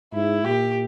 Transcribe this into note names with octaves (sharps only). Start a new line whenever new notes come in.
G#2 E4
A#2 G4